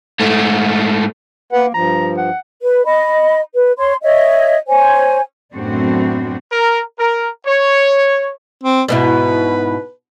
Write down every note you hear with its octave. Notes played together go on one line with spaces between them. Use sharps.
G#2 A3
A#3 B4 F#5
G2 F3 A#5
F#5
B4
D#5 B5
B4
C#5 C6
C#5 D#5 E5
C5 C#5 G#5
F#2 A2 B3 C4 D4 F#4
A#4
A#4
C#5
C4
G#2 B2 E4 B4